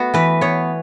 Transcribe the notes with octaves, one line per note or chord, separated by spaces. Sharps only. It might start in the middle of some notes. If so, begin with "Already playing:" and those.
Already playing: A3 B3 F#4
E3 B4
B3 C#5